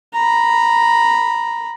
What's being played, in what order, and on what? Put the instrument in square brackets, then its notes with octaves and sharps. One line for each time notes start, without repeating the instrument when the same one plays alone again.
[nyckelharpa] A#5 B5